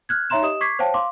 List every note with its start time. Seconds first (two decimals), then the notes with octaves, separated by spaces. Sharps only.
0.09 F6 F#6 G#6
0.30 D#4 C#5 E5 A#5 C6 E7
0.42 G4 D#5 D#6 E7
0.61 C#6 D6 G#6 B6 C7
0.79 C5 C#5 F5 G5 A5
0.94 F5 C6 D6